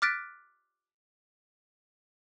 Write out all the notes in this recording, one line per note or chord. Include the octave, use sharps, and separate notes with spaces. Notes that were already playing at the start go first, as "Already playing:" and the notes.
D6 F6 F#6 A6 B6 D7